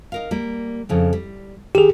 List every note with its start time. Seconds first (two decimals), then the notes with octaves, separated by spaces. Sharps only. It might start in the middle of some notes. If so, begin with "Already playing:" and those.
0.12 D#4 A#4 F5
0.31 G3 A#3
0.89 F2 C#3 E4
1.13 G3
1.75 D#3 G4 G#4